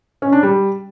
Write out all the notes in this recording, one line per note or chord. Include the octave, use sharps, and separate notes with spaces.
C#4
D4
G3